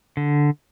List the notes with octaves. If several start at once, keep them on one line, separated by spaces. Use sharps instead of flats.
D3